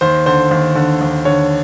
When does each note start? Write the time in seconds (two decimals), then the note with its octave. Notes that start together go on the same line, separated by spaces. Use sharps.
0.01 D#2 C5
0.26 D3 C5
0.51 D#2
0.75 D3
1.01 D#2
1.25 D3 C#5